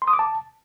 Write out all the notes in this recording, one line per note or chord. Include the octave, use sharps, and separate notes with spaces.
C6
D#6
D6
A5